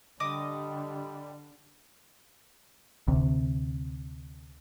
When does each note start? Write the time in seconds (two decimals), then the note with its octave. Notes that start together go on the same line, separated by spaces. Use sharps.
0.20 D3 G3 D#5 D6 D#6
3.08 D2 C3